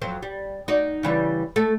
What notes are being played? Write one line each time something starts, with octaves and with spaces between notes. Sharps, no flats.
F2 F#3 C5
G3
D#4 F#4 D5
C#3 E3 G3
A3 A4